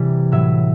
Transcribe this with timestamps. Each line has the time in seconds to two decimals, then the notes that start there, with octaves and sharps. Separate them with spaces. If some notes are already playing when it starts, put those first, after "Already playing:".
Already playing: C3 E3 G3
0.32 A2 F#3 E5